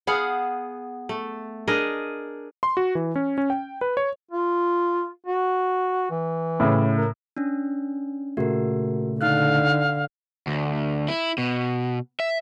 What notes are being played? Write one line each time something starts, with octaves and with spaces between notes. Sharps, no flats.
B3 G#4 F5 F#5
A3
D4 G#4 A#4 D#5
C6
F#4
E3
C#4
C#4
G5
B4
C#5
F4
F#4
E3
A2 C#3
A#4
C#4 D4
A#2 C#3 A3 F#4 A#4
D3 D#4 F5 F6 F#6
D2
E4
B2
E5